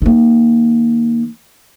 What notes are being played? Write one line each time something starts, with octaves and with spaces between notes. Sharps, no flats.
D#3 A#3